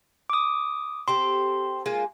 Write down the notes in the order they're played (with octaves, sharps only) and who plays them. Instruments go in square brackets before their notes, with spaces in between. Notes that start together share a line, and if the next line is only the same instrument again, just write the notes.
[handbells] D6 D#6
[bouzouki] C4 G4 A4 [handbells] C6
[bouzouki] G#3 A#3 F4